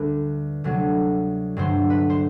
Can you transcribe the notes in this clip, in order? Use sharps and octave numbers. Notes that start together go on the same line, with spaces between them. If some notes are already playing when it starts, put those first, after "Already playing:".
Already playing: D2 D3 G3 B4
D2 C3 F#3 A3
G2 D3 F#3 A3 C5
B4
C5